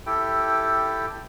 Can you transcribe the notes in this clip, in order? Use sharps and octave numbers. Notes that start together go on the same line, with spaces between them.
E4 G4 A4 G5